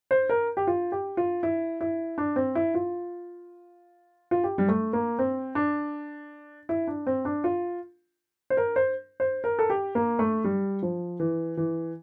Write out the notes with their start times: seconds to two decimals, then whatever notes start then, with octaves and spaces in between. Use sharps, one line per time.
0.11 C5
0.29 A#4
0.57 G4
0.67 F4
0.92 G4
1.17 F4
1.43 E4
1.81 E4
2.18 D4
2.36 C4
2.55 E4
2.75 F4
4.31 F4
4.44 G4
4.58 G3
4.68 A3
4.93 A#3
5.19 C4
5.55 D4
6.69 E4
6.88 D4
7.07 C4
7.25 D4
7.44 F4
8.50 C5
8.57 A#4
8.76 C5
9.20 C5
9.44 A#4
9.59 A4
9.70 G4
9.95 A#3
10.19 A3
10.44 G3
10.82 F3
11.20 E3
11.57 E3